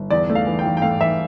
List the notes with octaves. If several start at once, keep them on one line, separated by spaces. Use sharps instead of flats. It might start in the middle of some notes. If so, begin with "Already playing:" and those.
Already playing: G1
E2 D5
A3
F5
E3
G5
E3
G5
A3 F5
E3 E5